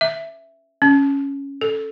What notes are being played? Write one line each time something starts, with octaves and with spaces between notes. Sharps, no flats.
E5
C#4
A4